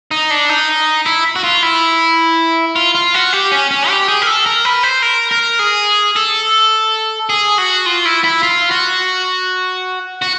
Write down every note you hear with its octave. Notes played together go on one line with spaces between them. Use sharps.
D#4
D4
D#4
E4
F#4
F4
E4
F4
F4
F#4
G4
C#4
C#4
G4
G#4
A#4
A4
A#4
B4
C5
A#4
A#4
G#4
A4
G#4
F#4
F4
E4
E4
F4
F#4
F#4